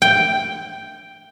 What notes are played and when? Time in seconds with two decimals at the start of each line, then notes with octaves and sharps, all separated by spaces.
0.02 G5